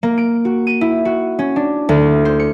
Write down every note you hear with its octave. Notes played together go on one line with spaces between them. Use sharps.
A#3
D7
F#4
D#7
E4
F#4
C#4
D4
D2
C5
C#7